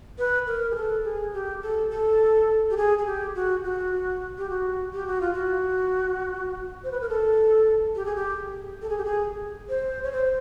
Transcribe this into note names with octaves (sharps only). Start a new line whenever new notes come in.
B4
A#4
G#4
A4
G#4
G4
A4
A4
G4
G#4
G#4
G4
F#4
F#4
G4
F#4
G4
F#4
F4
F#4
C5
B4
A#4
A4
G4
G#4
G4
A4
G#4
G4
G#4
C5
C#5
C5